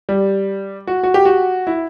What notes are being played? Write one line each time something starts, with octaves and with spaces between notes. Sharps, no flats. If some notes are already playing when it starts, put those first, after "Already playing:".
G3
F#4
F#4
G4
F#4
E4